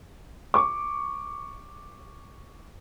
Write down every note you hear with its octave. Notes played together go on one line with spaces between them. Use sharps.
C#6 D6